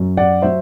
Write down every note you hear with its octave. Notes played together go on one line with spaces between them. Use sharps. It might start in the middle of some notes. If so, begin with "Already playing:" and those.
Already playing: F#2 F#3
D5 F#5
F#3 C5 E5